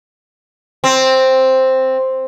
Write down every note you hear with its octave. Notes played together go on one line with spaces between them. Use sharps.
C4